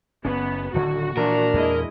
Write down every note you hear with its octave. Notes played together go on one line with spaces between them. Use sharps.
F#1 B3 C#4
D1 D3 D#3 F#4
A#2 E3 F3 D4 A#4
E2 A#2 G#3 A#3 E4 D#5